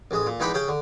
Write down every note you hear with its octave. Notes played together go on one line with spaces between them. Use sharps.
A1 G#3 D#6
A#2
E2 G#3 D#4 G5 B5 D6
C#3 C#4 G#4 G5
D3